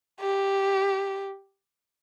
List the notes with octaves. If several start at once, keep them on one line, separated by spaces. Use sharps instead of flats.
G4